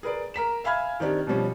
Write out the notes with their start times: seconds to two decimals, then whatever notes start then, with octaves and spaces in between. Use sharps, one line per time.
0.03 G#4 A#4 B4 D5
0.34 A#4 A#5 B6 E7
0.64 E5 F5 G#5 B5 F6 G#6
1.00 D#3 C4 D4 G4
1.27 B2 F3 G3 C#4